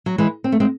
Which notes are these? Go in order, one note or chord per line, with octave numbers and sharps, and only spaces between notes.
F#3
E3 G#3
C4
A3
G#3 C4